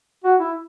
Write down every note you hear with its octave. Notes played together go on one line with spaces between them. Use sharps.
F#4
E4